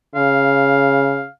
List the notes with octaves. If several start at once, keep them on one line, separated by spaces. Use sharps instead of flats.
C#3 F5